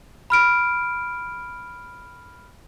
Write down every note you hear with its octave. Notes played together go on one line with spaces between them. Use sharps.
B5 F6 D7